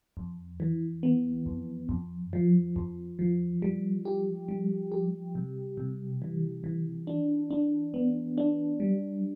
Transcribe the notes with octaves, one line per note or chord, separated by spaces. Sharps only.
F2
E3
B3
F2
F2
F3
F2
F3
G3
G4
G3
G4
C3
C3
E3
E3
D4
D4
B3
D4
G3